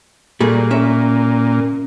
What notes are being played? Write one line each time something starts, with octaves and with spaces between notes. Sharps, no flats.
A#2 G3 A3 G#4
C#4 E5